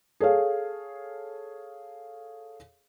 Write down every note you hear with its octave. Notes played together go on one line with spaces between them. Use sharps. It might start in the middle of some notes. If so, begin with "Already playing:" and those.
G#4 A4 C#5 F5